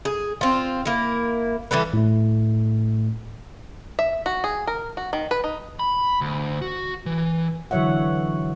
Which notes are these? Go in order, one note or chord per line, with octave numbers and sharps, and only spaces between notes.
G#4
C4 F4
A#3 E4
E3 G3 A4 B4
A2 A3
E5
F#4
G#4
A#4
F#4
D#3
B4
D#4
B5
D2
F#4
E3
D3 E3 F#3 C#5 E5 F#5